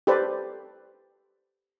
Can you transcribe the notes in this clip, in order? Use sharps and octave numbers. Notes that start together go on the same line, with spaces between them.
G4 A4 B4 C5 D5